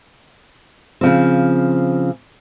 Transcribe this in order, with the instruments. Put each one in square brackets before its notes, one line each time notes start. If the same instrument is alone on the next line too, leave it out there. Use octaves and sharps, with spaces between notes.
[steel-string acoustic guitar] C#3 F3 C4